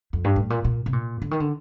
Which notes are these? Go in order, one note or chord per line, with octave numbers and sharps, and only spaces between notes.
F2
G2
A2
A#2
A#2
C3
A#2
D3
D#3
D3